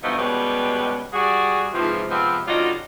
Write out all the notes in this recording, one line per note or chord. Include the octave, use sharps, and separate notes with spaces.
G2 B2 F3 A3 D#4
B2 G3 G#3 C#4 G4 B4
G3 F#4 G#4
G#2 C3 E3 F3
C3 F3 G#3 B3 C4
D3 G3 C#4 D#4 F4 F#4